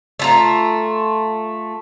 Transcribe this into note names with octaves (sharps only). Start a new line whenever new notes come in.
A3 F4 A#5